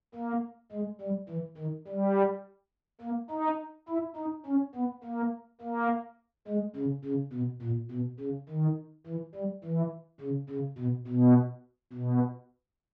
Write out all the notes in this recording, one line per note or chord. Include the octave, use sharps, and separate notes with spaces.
A#3
G#3
G3
E3
D#3
G3
A#3
D#4
E4
D#4
C#4
B3
A#3
A#3
G#3
C#3
C#3
B2
A#2
B2
C#3
D#3
E3
G3
E3
C#3
C#3
B2
B2
B2